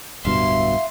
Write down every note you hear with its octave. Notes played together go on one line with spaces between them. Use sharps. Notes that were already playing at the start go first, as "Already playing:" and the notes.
D1 G2 B2 E4 E5 F5 C6